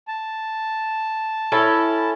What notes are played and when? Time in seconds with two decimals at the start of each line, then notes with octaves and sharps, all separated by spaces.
0.08 A5
1.52 C#4 E4 A4